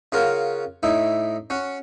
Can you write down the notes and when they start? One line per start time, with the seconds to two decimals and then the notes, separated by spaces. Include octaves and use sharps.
0.12 C#3 F4 F#4 A#4
0.83 A2 D#4 E4
1.50 C#4 F#4